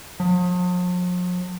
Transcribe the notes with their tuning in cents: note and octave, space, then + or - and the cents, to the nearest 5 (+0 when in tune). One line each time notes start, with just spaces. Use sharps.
F3 +45